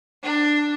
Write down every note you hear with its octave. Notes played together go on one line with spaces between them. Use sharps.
D4